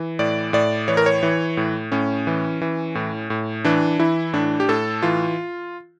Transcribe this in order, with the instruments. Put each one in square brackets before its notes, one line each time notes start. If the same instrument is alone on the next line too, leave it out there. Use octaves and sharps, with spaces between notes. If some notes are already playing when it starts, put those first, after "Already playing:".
Already playing: [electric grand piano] E3
A2 D5
A2 D5
E3 C#5
A#4
C#5
E3
A2
A2 C#4
E3
E3
A2
A2
E3 D4
E3 E4
A2 D4
G4
A2 A4
E3 F4